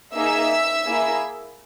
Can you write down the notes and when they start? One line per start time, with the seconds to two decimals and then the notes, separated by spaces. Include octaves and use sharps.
0.15 A#3 D#4 G#4 E5 E6
0.86 A#3 E4 G#4